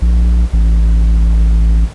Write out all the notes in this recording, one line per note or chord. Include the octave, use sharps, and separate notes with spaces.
A#1
A1